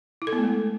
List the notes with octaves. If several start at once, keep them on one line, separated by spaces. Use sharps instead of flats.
E4
A4
B3
A3
G#3